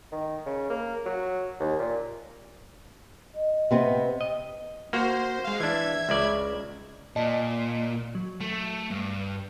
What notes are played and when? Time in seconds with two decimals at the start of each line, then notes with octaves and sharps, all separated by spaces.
0.12 D#3
0.46 C#3
0.70 A#3
1.06 F#3
1.59 D#2
1.79 A#2
3.35 D#5
3.71 C3 B3 C4
4.21 D#5
4.93 A#3 F#4 C5
5.44 G#3 F5
5.60 E3 D4 E5 G#6
6.09 C#2 C#3 D5
7.16 A#2 D5 D#5 A5
8.15 F#3
8.40 A3
8.91 G2